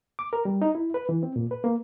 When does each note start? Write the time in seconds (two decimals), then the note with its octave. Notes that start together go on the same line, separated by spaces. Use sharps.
0.19 D6
0.33 A#4
0.45 G3
0.62 D#4
0.75 E4
0.94 B4
1.09 E3
1.23 C4
1.36 A#2
1.51 B4
1.64 A#3